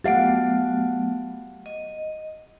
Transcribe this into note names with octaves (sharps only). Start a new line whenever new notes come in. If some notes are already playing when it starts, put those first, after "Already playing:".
F#3 A3 B3 G4 F5 F#5
D#5